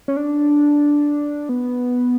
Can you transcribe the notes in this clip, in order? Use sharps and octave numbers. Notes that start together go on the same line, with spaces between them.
C#4
D4
B3